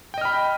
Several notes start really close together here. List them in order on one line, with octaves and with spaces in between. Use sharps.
G5 D#5 F6 B5